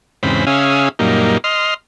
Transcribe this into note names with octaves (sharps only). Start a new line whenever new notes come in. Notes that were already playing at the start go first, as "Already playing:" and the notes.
E2 G#2 C#3 C4 B5
C#3 C#4 G#4 E5 F5 D#6
F#2 A#2 G3 A#3 D#4
D#5 C6 F6